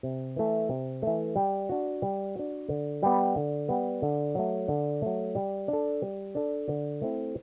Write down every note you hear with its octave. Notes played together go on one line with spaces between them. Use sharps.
C3
E3 A3
C3
E3 A3
G3
D4 F#4
G3
D4 F#4
D3
G3 B3
D3
G3 B3
D3
F#3 A3
D3
F#3 A3
G3
D4 A4
G3
D4 A4
D3
A3 C4 E4